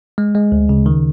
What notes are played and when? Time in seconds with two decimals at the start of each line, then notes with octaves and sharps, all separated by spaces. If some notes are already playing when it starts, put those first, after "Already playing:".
0.18 G#3
0.35 G#3
0.52 D2
0.69 C#3
0.86 D#3